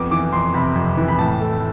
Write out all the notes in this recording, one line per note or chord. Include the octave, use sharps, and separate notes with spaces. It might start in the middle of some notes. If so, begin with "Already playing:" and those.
Already playing: F2 B3 D6
E3 D6
F2 C6
C3 B5
F2
E3
B5
A2 A5
A3